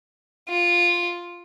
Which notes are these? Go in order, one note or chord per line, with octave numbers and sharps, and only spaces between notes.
F4